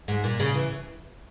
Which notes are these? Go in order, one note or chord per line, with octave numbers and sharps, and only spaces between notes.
G#2
A#2
C#3
E3